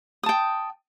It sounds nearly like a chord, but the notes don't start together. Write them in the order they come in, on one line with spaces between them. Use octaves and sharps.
D#6 A5 G5